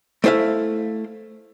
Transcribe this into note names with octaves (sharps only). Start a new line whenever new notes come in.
A3 E4 C5 E5 F5